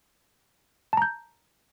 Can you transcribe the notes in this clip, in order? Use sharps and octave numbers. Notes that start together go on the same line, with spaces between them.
A5 A#5 G6